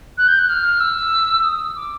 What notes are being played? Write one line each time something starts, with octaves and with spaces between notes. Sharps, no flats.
F#6
G6
F#6
F6
E6
D#6
D6